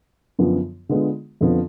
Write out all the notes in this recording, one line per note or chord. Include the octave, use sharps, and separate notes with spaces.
F#2 D3 F3 B3 F4
D3 G#3 B3 F4
F2 D3 F3 B3